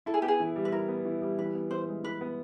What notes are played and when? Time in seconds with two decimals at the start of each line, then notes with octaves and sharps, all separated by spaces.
0.06 E4 A4
0.14 G#4
0.22 B3 G4
0.28 G#4
0.40 E3
0.56 G3
0.65 B4
0.72 E4 A#4
0.88 B3
1.05 E3
1.22 G3
1.39 E3 B4
1.55 B3
1.71 E3 C5
1.88 G#3
2.03 E3 B4
2.21 B3